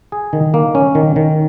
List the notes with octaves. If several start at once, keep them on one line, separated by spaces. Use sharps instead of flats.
G#4
D#3
A#3
C#4
D#3
D#3